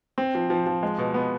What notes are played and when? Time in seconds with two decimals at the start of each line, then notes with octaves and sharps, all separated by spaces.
0.18 C4
0.35 F3
0.50 F3
0.66 F3
0.83 G#3
0.98 B2
1.14 B3